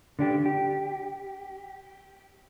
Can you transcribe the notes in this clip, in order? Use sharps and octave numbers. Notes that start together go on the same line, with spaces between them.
D3 D4 G4
G4